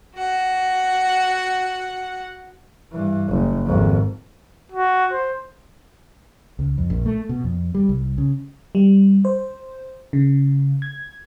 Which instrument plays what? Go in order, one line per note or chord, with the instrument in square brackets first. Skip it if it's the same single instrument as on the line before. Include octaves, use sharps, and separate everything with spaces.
[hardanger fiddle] F#4 F#5
[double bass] G2 E3
F#1
G#1 F2
[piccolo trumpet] F#4
C5
[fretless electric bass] C#2
F2
A#1
A3
B2
F2
G3
C2
C#3
[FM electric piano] G3
C5
C#3
G#6